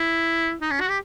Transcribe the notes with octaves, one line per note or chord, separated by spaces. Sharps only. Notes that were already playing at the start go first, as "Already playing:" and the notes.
Already playing: E4
D#4
C#4
F#4
G4